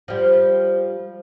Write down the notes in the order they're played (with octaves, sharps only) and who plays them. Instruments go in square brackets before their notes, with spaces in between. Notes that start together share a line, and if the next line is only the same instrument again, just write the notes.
[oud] F3 G3